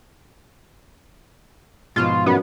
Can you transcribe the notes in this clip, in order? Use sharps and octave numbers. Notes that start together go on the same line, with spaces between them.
G#2 B2 F3 F4
F#2 B3